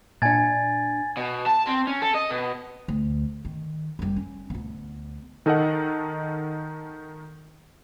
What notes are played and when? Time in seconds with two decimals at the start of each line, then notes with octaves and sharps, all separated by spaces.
0.22 A#2 D4 G#5 G#6 A6
1.17 B2
1.46 A5
1.67 C4
1.87 C#4
2.02 A4
2.15 D#5
2.30 B2
2.88 D2
3.45 D#3
3.99 F#1 G3
4.16 C#4
4.50 D2 B3
5.46 D#3 D#4 A4 A#4 D#5 F#5